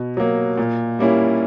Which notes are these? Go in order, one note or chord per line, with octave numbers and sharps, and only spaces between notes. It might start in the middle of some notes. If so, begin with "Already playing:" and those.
Already playing: B2
F#3 A#3
A#2
G3 A#3 C#4 E4